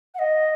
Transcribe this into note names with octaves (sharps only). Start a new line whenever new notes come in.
F#5
D#5